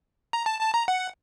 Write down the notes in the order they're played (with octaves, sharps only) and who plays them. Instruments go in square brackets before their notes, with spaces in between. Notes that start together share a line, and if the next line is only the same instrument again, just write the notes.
[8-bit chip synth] A#5
A5
A5
A#5
F#5